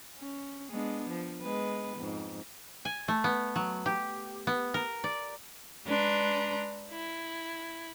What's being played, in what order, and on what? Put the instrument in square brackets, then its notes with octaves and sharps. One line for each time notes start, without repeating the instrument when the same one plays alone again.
[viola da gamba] C#4
G#3 B3 D4
F3
G#3 B3 B4
F2 G#2
[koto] G#5
A3
B3
F#3
G4
B3
A#4
D5
[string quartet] G#3 D4 B4 A#5 C6
E4